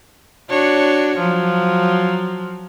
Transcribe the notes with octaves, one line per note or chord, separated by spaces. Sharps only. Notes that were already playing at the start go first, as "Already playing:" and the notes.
D4 F#4 C#5
F3 F#3